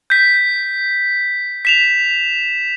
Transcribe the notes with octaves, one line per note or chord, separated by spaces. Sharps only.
G6 B6
B6 E7 F7